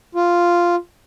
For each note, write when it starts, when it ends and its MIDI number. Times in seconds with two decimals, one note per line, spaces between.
0.15 0.76 65